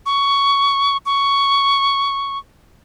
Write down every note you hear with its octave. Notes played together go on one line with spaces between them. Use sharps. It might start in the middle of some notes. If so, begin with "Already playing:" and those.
C#6
C#6